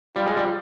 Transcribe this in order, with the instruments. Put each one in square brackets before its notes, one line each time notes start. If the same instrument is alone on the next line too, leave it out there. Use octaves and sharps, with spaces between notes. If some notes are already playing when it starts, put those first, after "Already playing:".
[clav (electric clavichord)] G3 [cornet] F4
[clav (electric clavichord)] G#3
G3